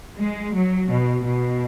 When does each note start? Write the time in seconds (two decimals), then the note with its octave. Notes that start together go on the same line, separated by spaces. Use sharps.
0.17 G#3
0.54 F#3
0.90 B2
1.25 B2